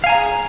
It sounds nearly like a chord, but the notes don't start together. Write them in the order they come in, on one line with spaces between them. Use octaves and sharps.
F5 G#5 A#5 C#5 G#4